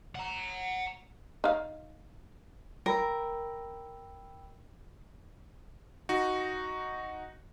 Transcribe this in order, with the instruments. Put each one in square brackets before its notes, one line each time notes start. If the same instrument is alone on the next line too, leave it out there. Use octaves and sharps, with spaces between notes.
[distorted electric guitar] F#5 A#5
[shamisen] D#4 F5
[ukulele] A#4 [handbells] G5 B5 E6
[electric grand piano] D#4 F#4